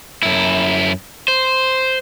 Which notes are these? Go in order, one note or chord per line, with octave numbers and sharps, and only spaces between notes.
F#2 E4
C5